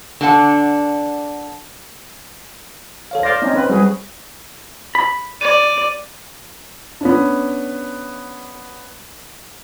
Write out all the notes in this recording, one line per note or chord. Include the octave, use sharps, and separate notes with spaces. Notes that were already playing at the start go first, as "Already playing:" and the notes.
D3 D4 F#5
A4 C#5 F5
C5 D5 F5 A#6
C4 C#4 D#4
C4 B4
G3 F#4 G#4 B4
B5
D5 D#7
B3 C#4 D4